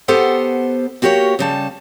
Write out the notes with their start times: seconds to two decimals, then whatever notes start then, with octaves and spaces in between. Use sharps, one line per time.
0.08 B3 G4 A4 C5 F#5
1.02 A#3 F#4 G4 A#4 C#5
1.39 C#3 G3 A5